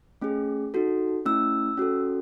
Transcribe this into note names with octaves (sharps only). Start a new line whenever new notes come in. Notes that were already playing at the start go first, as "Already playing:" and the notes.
A3 C#4 G#4
D#4 F#4 A4
A3 C#4 E4 E6
C#4 F#4 A4